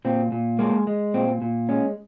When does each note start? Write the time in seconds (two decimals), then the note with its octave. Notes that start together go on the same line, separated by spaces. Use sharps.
0.05 A#2 C4
0.32 A#2
0.59 G#3 A#3
0.87 G#3
1.14 A#2 C4
1.42 A#2
1.69 G#3 C#4